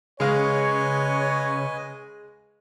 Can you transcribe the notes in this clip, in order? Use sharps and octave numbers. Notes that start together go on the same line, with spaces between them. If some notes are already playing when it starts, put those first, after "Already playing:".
C#3 G#3 B4 C#5 D#5 F5 G#5